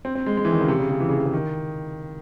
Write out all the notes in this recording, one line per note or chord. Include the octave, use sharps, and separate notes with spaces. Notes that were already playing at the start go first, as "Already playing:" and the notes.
C4
C4
G#3
G#3
E3
D#3
C#3
C3
C#3
C#3
E3
C#3
C3
C#3
D#3